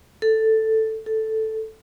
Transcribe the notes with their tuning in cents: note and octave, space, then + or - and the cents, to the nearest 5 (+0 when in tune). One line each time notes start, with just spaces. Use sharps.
A4 +5
A4 +0